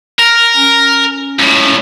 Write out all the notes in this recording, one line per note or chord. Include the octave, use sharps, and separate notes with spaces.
A#4
C#4
C#2 A2